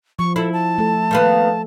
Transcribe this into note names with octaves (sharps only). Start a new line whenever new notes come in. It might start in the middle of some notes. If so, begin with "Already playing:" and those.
F3 C#6
E4 A4
A5
A3 A4
D#3 A#3 B3